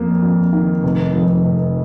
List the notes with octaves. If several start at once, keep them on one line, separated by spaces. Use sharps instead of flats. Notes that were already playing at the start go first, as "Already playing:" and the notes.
Already playing: F2 A#3
F2
D#3
F1
F2
F1